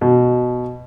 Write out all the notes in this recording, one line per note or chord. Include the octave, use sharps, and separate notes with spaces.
B2